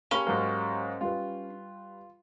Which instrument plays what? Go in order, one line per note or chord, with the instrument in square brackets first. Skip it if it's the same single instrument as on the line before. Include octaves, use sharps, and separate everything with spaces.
[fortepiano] A#3 B5 [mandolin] C#4 [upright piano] G4
[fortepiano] G#2 F#3 A#3
[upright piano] G3 B4 [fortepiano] F4